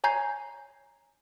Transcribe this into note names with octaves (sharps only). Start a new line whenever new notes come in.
C#5 G#5 A#5 G6 G#6 C7